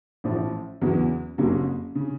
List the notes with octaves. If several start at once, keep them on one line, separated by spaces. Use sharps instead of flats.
A1 A2 F3
E2 C#3 F#3 B3
F#1 F2 C#3 F#3 A#3
C#3